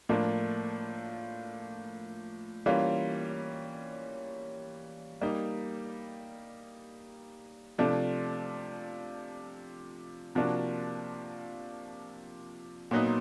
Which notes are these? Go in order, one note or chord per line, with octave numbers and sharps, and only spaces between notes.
A2 F3 A#3 D4 F4
E3 G3 A#3 C#4 F4
G3 A#3 D#4
C3 F3 A3 D4
C3 F3 A#3 D4 F#4
A#2 F#3 B3 D#4